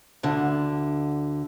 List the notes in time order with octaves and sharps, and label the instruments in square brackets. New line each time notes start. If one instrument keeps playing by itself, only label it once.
[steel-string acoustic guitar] D2 D3